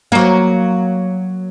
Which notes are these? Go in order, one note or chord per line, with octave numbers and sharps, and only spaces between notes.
F#3 A#3